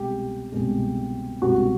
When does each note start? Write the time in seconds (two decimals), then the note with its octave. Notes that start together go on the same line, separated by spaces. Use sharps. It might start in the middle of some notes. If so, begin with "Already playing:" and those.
Already playing: C2 B2 G#3 G4
0.52 C2 B2 G#3
1.42 C2 B2 G#3 F#4